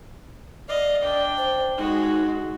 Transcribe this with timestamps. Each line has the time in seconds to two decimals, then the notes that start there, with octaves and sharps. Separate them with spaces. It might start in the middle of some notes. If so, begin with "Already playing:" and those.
0.68 D5 D#5 F5
1.04 D4 G5
1.38 C5
1.77 G#3 D#4 F#4